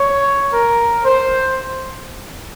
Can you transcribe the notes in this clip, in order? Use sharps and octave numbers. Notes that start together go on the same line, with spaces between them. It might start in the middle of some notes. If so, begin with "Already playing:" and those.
Already playing: C#5
A#4
C5